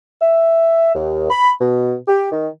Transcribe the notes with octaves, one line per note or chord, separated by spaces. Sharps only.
E5
D#2
B5
B2
G4
D#3